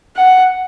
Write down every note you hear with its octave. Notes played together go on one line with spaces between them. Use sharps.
F#5